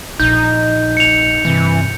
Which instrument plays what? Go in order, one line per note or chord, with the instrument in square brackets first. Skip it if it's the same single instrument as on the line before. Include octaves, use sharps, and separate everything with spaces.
[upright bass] A#1 [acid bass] D#4 [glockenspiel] G6
[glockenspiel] C#7 F7
[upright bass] G2 C3 [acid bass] E3